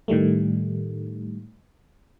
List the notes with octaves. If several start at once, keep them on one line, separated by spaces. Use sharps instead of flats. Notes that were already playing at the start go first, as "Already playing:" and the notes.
A2 D#3 G3 A3